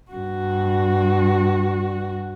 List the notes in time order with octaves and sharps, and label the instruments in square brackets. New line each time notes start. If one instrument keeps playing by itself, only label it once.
[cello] G2 F#4